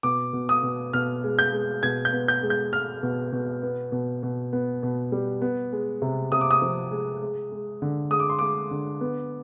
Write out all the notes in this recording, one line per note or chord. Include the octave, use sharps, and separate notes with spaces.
B2 D6
B2
D#6
B2
B2 F6
G#3
G6
G#3
B2 G#6
G6
B3
G6
G#3
G6
G#3 F6
B2
B2
B3
B2
B2
B3
B2
G3
B3
G#3
C3
C3 D#6
D6
D#6
F3
G#3
G#3
G#3
D3
G#3 D#6
D6
C6
G#3 D6
D3
B3